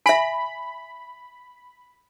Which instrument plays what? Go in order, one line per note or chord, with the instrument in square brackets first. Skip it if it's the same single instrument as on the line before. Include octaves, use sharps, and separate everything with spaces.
[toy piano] E5 G#5 [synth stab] B5